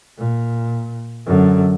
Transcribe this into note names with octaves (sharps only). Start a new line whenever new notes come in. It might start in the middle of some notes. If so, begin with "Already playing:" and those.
A#2
F#2 D3